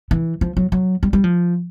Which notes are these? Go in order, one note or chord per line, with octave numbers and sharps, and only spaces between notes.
E3
F3
F#3
F#3
G3
G3
F3